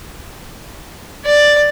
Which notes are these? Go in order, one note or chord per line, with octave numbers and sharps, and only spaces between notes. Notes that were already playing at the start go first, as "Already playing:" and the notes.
D5